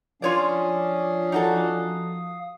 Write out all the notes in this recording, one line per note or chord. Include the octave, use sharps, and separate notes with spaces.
F3 C#4 D4 F4 C#5 D5 F5 D#6
D#4 F#4 A4